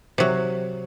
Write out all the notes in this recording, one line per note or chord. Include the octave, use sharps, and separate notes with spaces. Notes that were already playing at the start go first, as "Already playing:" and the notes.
C3 F#3